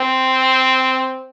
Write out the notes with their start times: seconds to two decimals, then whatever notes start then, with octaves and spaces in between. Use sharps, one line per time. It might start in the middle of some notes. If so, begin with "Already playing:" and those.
Already playing: C4